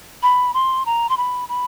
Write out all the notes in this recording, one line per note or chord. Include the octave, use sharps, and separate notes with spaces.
B5
C6
A#5
C6
B5
B5